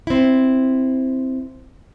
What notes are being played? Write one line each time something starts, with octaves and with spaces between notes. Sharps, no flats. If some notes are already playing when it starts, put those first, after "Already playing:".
C4 E4